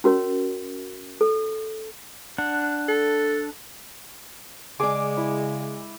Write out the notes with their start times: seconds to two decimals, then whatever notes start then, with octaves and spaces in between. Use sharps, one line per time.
0.04 C#4 F#4 A#4 C#5
1.21 A4
2.38 D4 F#5
2.89 A4
4.80 C#3 G#3 G#4 D5 D6
5.17 E4